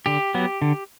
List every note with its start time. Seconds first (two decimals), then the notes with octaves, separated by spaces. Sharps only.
0.06 D3 G4
0.34 F#3 B3
0.62 D3